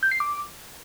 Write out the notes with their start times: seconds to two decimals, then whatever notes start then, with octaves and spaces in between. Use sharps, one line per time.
0.03 G6
0.11 C7
0.20 D6